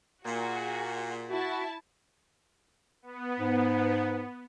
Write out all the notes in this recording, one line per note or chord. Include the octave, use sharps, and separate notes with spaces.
A#2 F#4 G#4
E4 F#4 A5
B3
G#2